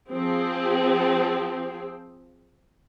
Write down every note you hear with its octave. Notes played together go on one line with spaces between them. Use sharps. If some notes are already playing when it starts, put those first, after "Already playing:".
F3 C4 G#4